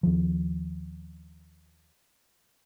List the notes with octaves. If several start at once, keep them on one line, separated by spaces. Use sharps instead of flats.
D#2 F3